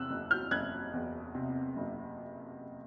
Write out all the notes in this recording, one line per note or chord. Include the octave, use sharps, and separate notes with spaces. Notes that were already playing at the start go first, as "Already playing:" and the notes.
Already playing: E2 C3 E6 F#6
F#1
F6 G6
F#1 F#6 G#6
E2
C3
F#1